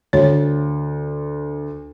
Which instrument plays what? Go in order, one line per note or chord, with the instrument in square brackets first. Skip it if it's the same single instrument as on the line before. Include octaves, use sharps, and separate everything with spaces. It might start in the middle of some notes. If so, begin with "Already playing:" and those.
[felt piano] D2 [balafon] C#5